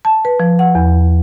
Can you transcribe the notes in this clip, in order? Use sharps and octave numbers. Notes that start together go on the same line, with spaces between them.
A5
B4
F3
F#5
E2